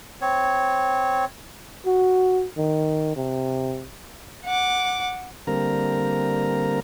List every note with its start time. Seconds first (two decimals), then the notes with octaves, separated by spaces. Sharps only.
0.21 C4 C#5
1.86 F#4
2.57 D#3
3.16 C3
4.44 F#5 D6
5.47 D3 G3 A#3 C4 A#4 A#5